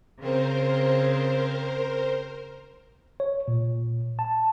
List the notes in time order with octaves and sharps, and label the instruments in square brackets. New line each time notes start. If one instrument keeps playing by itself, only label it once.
[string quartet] C#3 C4 [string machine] A#4 C5
[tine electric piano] C#5
A#2
A5